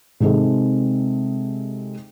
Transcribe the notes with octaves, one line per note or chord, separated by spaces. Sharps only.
C3 G#3 C4 D#4 G#4 A4